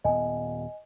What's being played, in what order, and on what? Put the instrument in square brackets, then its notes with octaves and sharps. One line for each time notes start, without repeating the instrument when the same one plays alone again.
[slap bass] D#1 B3 [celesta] D#5 G#5